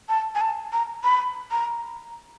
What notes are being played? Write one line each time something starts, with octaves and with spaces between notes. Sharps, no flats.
A5
G#5
A5
A#5
B5
A#5